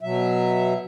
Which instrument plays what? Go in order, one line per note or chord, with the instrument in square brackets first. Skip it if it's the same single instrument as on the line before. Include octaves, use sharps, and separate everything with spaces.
[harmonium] B2 F#3 E5